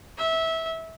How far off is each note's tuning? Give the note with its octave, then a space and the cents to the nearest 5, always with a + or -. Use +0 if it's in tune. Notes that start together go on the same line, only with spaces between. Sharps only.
E5 -20